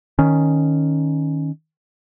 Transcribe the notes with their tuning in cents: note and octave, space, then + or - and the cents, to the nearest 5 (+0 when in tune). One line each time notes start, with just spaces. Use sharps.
D#3 +0 C#4 +0